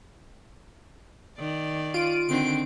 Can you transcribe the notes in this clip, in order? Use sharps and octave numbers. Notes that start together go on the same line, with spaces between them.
D#3 D5
F4 D7 D#7
D3 D#3 C4 D7